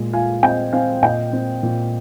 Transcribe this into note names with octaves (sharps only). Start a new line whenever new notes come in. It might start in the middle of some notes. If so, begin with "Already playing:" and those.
Already playing: A#2 G#3
F4 F5 G#5
C4 D#5 G5
C4 F5 G#5
A#2 D#5 G5
C4
A#2